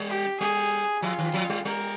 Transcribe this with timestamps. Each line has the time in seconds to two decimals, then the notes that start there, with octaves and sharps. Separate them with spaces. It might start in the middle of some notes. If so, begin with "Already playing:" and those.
Already playing: G3
0.09 G4
0.41 G3 G#4
1.02 F3 F4
1.18 D#3
1.34 F3
1.49 G3
1.65 G3 A#4